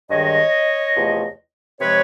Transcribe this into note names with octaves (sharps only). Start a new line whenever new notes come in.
G2 D#3 G#3 C#5 D#5
E2 C3 F3 A3
C3 F3 G#3 B4 C#5